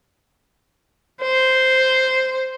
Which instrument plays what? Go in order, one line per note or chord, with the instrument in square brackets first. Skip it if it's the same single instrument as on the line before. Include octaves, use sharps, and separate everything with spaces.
[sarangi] C5